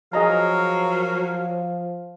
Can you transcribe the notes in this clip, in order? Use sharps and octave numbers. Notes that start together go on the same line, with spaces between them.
F3 F#3 G#4 A#4 D#5 F5 A#5